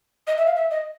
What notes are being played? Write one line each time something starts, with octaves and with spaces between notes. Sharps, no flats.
D#5
E5
F5
E5
D#5